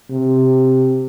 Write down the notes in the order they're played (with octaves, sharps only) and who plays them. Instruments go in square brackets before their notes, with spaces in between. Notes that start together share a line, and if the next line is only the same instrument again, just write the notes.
[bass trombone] C3